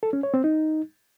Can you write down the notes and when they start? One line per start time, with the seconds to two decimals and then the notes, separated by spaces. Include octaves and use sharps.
0.03 A4
0.13 C#4
0.23 C#5
0.34 C4
0.44 D#4